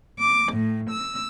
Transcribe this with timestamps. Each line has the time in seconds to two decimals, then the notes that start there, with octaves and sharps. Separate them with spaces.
0.19 D6
0.52 A2
0.91 E6